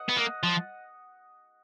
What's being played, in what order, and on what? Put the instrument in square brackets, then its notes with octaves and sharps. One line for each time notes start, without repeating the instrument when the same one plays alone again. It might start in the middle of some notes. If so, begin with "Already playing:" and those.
Already playing: [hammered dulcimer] D#5 F#5
[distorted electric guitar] B3
A#3
F3